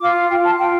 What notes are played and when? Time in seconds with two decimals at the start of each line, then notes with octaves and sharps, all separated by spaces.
0.01 F4 D6
0.30 F4 G5
0.45 A5
0.59 F4 G5